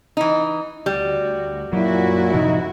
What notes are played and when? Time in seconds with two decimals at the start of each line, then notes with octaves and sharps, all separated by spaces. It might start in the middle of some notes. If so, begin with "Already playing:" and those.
0.17 E3 D#4
0.86 D2 G3 F#4
1.73 F#2 A#2 F#3 E4 F#4
2.34 A2 C3 F3 D#4